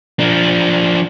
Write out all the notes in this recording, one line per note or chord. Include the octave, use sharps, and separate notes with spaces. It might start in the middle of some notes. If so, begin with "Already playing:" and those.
F3 D4